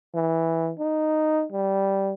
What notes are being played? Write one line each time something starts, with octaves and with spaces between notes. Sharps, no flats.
E3
D#4
G3